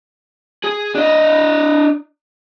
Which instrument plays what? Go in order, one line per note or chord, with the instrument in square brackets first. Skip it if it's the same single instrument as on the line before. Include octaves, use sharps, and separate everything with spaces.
[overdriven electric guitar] G#4
D4 D#5